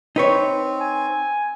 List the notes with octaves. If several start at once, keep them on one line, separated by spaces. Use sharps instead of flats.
C4 D#4 B4 C#5
G#5